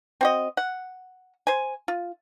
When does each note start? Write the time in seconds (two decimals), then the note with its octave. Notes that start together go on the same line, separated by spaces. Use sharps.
0.21 C4 F#4 D#5
0.57 F#5
1.47 C5 G#5
1.88 F4